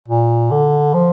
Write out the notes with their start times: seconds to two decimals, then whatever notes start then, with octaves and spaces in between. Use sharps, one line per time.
0.08 A#2
0.51 D3
0.94 F3